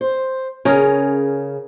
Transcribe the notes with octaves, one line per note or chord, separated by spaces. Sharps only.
C5
C#3 C#4 G#4 A#4